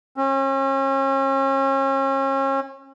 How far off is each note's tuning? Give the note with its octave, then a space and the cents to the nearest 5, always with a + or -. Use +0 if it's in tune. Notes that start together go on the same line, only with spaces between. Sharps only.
C#4 -40